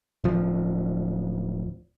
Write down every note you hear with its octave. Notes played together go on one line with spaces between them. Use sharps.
D1 F3